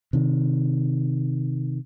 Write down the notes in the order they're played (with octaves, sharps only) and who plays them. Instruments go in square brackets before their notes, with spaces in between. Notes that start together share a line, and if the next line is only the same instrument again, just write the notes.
[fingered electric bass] C3 D#3